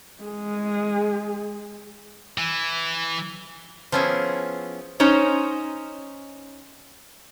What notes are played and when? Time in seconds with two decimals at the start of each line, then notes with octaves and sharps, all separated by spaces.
0.23 G#3 G#4
2.38 E3
3.92 F3 B3 C#4 E4 G#4
5.00 C#4 D#4 C5 C#5